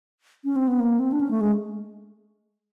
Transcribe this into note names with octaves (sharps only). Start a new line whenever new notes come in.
C#4
C4
B3
A#3
C4
D4
C#4
A3
G#3